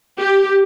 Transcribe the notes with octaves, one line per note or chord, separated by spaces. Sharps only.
G4